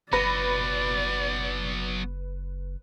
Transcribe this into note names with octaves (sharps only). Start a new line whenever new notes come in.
F#1 F#3 B3 B4 D5 B5 A#6